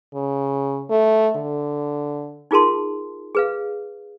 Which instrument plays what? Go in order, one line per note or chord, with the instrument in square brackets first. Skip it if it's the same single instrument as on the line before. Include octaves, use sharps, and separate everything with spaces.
[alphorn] C#3
A3
D3
[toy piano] D#4 F4 G#4 A#4 A5 C6
G#4 B4 F5